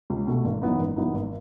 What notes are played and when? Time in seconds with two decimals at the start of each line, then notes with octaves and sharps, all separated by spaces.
0.10 C#2
0.27 B2 A3
0.45 G#1
0.62 F#2 E3 B3 D#4
0.79 G#1
0.96 F#2 E3 B3 D#4
1.14 G#1